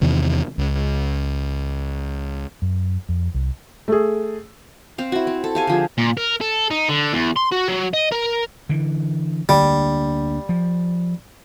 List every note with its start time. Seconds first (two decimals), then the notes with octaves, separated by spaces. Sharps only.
0.01 E2 C3 D#3
0.58 C#2
2.62 F#2
3.09 F2
3.34 C2
3.88 A3 G#4
4.98 C4 F5
5.12 E4 F#4
5.27 C4
5.44 A4
5.55 G4 F5 G#5
5.67 D3 F3 G#4
5.98 A#2
6.17 A#4
6.41 A4
6.71 D#4
6.89 D3
7.13 E2
7.36 C6
7.52 F#4
7.68 F#3
7.94 D#5
8.11 A#4
8.69 D3 E3
9.49 D2 D3 G3 A#3
10.49 F3